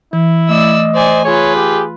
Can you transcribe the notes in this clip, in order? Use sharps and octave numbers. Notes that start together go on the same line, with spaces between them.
E3 E4
A3 D5 D#5 E6
C5 D5 G#5
F4 G#4 B4 C#5
G4